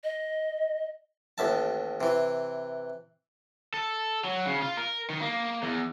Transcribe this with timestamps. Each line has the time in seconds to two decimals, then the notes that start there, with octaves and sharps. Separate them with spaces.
0.04 D#5
1.38 A1 D#2 E5 A5
2.01 C3 E3
3.74 A4
4.25 F#3
4.46 C#3
4.62 F4
4.77 A#4
5.10 D#3
5.21 A#3
5.63 E2